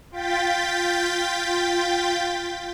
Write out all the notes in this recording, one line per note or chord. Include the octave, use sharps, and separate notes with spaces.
F4 G5 G6 A6 B6